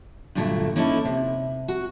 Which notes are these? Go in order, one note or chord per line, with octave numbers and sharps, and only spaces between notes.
G2 A#2 D3 F#3 G3 A3
A#3 C#4 D#4 E4 A4
C3
F#4